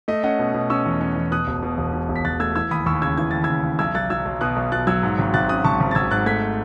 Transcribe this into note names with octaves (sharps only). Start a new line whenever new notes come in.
A3 D#5
C#4 D#5 F#5
B2
B2
C#4 C#6 E6
E2
C#4
E2
B2 D#6 F#6
E1
B2
E1
B2
E1
B6
E1 F#6 A6
A3 E6 G#6
E3 E6 G#6
D#2 B5 D#6
D#2 C#6 E6
C#3 E6 G#6
E3 G#6
D#2 A6
C#3 E6 G#6
C#3
B1 E6 G#6
B1 F#6 A6
F#3 E6 G#6
B1
B2 D#6 F#6
B1
B2 F#6 A6
F#3 E6 G#6
G#2
G#1
G#1 F#6 A6
C#4 D#6 F#6
G#1 A5 C#6
G#1
A6
G#1 E6 G#6
G#2 F#6 A6
A3 G#6 B6